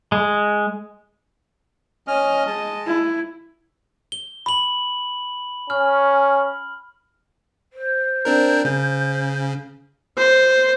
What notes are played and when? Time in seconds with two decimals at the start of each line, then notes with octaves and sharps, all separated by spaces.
0.12 G#3
2.08 C#4 D#5 F6
2.47 G#3 A5
2.86 E4
4.12 G7
4.46 B5 F#7
5.70 C#4 F6
7.73 C5
8.25 C4 D4 A#4
8.65 C#3
10.17 C5